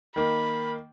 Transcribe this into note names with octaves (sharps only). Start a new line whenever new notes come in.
D#3 A#3 B5